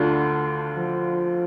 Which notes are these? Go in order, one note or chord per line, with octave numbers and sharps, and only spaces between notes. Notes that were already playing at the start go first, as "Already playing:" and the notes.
Already playing: D2 D3 D4 F4
F3